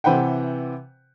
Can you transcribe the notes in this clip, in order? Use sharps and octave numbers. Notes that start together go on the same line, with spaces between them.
C3 E3 B4 C5 F#5 G5